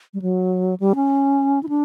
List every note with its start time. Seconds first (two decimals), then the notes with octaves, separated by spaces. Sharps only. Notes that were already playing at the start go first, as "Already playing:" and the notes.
0.14 G3
0.22 F#3
0.80 G3
0.95 C#4
1.63 E4
1.69 D4